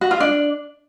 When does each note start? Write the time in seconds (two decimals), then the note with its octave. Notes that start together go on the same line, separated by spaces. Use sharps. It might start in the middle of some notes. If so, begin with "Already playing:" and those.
0.01 F#4
0.11 F4
0.20 D4